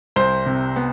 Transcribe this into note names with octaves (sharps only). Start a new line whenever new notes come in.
C2 C5
C3
B3